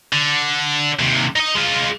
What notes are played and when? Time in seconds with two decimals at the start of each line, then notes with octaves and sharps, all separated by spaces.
0.13 D3
0.99 D#2 C3
1.36 D#4 D#5
1.55 G#3 F4